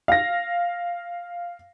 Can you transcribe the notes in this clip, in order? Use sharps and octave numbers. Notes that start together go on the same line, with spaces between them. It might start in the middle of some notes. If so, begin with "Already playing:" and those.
F5 A#6